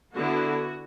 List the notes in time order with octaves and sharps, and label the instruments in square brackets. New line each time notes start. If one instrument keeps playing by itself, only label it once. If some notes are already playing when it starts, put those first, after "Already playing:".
[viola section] D3 B3 E4 F#4